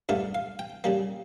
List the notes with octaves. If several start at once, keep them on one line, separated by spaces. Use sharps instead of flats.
G2 D3 A3 F5
F5
G5
C#3 G3 A#3